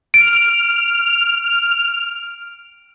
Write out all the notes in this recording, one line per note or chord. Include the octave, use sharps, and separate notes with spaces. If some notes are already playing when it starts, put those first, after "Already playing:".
F6 D7